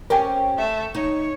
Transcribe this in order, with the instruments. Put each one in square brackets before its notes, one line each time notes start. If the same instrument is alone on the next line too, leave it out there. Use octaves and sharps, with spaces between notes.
[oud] C4 C#4 G4 [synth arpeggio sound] A#4 G5 G#5
[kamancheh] A3 E5
[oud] D#4 [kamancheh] C#5